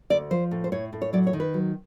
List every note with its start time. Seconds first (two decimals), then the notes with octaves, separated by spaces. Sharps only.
0.10 D2 D5
0.31 F3 C5
0.51 A2
0.64 C5
0.72 A2 C#5
0.93 A2
1.02 C#5
1.13 F#3 D5
1.27 C#5
1.33 D#3
1.40 B4
1.54 F#3